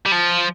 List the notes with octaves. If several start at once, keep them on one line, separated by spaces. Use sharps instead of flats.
G3
F3